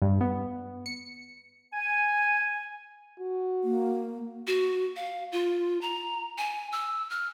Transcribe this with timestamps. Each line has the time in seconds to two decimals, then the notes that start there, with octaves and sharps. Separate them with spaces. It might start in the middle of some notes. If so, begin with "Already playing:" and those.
0.02 G2
0.21 B3
0.86 C#7
1.73 G#5
3.19 F#4
3.64 A#3
4.47 F#4
4.96 F5
5.32 F4
5.81 A#5
6.38 G#5
6.72 E6
7.10 F6